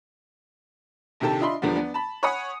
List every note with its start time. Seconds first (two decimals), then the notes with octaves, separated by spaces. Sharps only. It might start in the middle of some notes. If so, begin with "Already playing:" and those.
1.20 A#1 C3 D#3 G4 A4 A5
1.40 D4 F4 D#5 E5 B5 C6
1.62 E2 D3 F3 G3 B3
1.76 B3 D4
1.94 A5 B5
2.23 C#5 F#5 G#5 B5 D#6 C#7